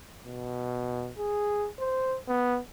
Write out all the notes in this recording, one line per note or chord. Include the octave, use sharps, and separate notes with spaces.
B2
G#4
C5
B3